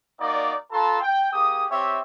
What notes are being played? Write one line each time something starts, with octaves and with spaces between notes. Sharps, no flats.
A#3 D#4 F#4 D5
F4 A4 B4 A5 A#5 C6
G5
A#3 G4 G#4 D#6
C4 G4 C#5 E5